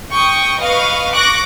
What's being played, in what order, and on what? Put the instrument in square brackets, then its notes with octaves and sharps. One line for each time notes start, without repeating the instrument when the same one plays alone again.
[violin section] G5 C#6 D#6
B4 D#5 F5 C#6
C#6 D6 F#6 A#6